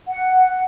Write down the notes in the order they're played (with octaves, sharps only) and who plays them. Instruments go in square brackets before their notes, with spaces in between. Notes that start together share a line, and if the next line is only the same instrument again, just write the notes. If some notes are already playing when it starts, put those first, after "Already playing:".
[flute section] F#5